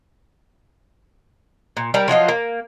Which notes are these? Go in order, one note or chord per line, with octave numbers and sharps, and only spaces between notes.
A#2
G3 A#4
F3 F#3 F4 D#5
A#3